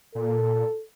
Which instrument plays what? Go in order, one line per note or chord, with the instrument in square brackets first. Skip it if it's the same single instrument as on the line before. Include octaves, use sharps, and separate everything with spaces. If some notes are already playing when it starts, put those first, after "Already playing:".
[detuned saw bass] A#2 [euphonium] A4